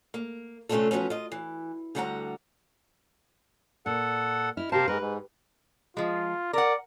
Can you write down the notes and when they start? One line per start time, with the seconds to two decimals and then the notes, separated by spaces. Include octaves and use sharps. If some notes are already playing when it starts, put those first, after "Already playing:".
0.14 A#3
0.69 C3 A3 C#4 D4 F4 A4
0.91 F3 F#3 B3 C#4
1.10 F4 D#5
1.32 E3
1.95 D2 D3 G3 F#5 G5 A#5
3.86 A#2 A4 F#5
4.57 E4 D#5 F6
4.72 C3 G4 A#4 C5 F5 A5
4.88 G#2 A#4 B4
5.01 G#2
5.97 F3 G#3 F4
6.53 A#4 D5 F#5